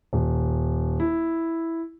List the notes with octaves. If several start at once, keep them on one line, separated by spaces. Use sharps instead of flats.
D#1
E4